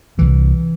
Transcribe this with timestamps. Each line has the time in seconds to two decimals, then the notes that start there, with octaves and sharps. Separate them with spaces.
0.18 C2 C3 E3